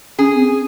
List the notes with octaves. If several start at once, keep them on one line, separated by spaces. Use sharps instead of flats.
C#4 G#4
C4